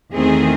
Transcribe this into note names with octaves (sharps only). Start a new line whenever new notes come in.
E2 D#3 A3 C4 G#4